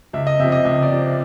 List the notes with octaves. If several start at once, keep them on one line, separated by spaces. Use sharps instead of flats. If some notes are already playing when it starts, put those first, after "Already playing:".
C#2 E5
D#5
C3 F3 E5
D#5
C#2 E5
D5
C3 F3